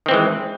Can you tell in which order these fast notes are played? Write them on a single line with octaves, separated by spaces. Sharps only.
D#3 C4 E3 G#3